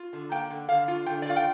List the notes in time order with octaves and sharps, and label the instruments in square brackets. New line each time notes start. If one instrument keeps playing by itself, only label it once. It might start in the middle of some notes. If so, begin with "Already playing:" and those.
Already playing: [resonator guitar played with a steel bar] F4
D3
A#3 G5
D3
D3 F5
F4
D3 G5
D5
F4 F5
G5